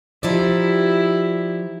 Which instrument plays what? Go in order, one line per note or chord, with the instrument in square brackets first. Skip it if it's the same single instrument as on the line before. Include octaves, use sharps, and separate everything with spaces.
[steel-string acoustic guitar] F3 D#4 D5 [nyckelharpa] E4 G4